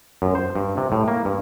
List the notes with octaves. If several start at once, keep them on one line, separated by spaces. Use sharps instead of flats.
F#2
C5
G2
C3
A2
A#3
G2